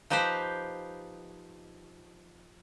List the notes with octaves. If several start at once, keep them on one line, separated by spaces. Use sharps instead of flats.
F3 D#4 G4 B4 C5